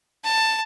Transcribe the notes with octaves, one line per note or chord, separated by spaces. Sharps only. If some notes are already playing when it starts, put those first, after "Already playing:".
A5